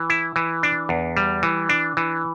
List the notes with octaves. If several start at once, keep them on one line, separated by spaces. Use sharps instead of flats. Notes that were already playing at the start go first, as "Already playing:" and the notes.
Already playing: E3
E4
E3
D4
E2
G3
E3
D4
E3